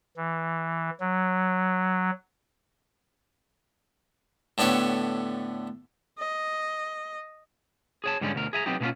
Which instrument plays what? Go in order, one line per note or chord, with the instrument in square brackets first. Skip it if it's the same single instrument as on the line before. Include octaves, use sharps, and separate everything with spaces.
[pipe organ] E3
F#3
[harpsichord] A2 D3 B3 G4 C#5
[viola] D#5
[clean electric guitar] G#4 C#5 A5
G#2 D3 G3 G#3 C#4
D2 B2 A#4
G#4 E5 G#5 A#5
F#3 B3 C4 D#4 G4
B2 D3 A#3 B3 C#4 F4